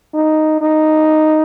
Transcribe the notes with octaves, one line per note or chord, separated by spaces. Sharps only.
D#4
D#4